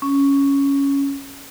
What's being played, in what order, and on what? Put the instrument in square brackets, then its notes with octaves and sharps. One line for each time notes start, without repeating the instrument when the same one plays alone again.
[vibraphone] C#4